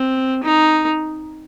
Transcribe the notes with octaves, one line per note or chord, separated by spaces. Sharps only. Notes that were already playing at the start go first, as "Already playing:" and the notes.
Already playing: C4
D#4